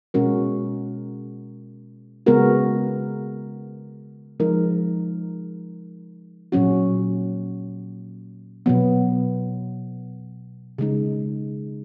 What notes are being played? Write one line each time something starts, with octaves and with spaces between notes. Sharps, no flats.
B2 G#3 C#4 F#4 A#4
C#3 G#3 B3 F#4 A#4
F3 G#3 D#4 A#4
A#2 F#3 C#4 F#4
B2 F#3 B3
C#3 G#3 D#4